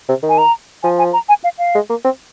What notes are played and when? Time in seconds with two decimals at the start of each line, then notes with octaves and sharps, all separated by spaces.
0.09 C3
0.23 D#3
0.29 G#5
0.38 A#5
0.83 F3 G#5
0.99 G#5
1.13 A#5
1.29 G#5
1.44 F5
1.58 F5
1.75 G#3
1.89 A#3
2.04 C4